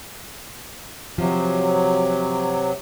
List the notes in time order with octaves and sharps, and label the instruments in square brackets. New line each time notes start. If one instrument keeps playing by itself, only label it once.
[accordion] C3 F#3 [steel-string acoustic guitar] F3